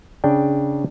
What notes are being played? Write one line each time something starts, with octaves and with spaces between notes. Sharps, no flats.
C#3 D4 G5